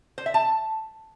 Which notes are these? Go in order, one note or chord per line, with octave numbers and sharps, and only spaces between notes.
C5
E5
A5